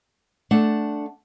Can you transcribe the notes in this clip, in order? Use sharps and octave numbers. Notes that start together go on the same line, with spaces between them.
A3 D4 F#5